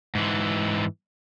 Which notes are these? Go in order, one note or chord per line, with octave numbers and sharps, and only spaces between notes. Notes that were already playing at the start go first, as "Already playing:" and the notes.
G#2 E3